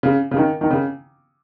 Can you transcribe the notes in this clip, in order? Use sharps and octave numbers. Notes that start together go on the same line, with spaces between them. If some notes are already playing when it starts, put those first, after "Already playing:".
C#3
C#3
D#3
D#3
C#3